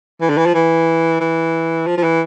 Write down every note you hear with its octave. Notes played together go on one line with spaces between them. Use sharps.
E3
D3
E3
F3
E3
E3
F3
F3
E3